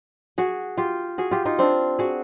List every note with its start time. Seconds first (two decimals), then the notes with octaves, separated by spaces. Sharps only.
0.38 F#4 G#4
0.78 F4 G4
1.18 F#4 G#4
1.31 F4 G4
1.45 D#4 F4
1.59 C4 D4
1.99 F#4 G#4